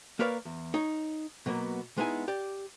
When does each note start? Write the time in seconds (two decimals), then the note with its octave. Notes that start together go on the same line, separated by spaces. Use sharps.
0.19 A#3 A#4 B4 C#5 D5 F5
0.45 E2
0.74 D#4 C#5
1.46 B2 F#3 A#3 B3
1.98 G#3 B3 D#4 E4 G#5
2.28 G4 D5